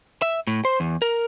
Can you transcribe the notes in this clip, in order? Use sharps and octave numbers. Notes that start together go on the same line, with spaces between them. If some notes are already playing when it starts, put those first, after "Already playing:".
E5
A2
C5
E2
A#4